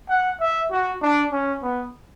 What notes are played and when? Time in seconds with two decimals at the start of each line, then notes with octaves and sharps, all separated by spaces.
0.09 F#5
0.41 E5
0.71 F#4
1.02 D4
1.32 C#4
1.63 B3